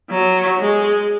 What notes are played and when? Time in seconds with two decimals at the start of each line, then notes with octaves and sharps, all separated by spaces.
0.10 F#3
0.59 G#3